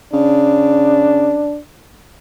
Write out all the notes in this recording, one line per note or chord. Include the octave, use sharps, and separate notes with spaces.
C#3 D4